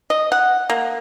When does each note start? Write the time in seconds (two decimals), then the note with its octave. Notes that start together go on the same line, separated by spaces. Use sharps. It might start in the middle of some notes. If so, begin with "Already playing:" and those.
0.10 D#5
0.32 F#5
0.70 A#3